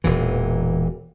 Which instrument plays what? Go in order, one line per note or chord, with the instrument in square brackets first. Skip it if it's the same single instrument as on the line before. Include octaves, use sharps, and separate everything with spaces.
[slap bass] E1 A#2 E3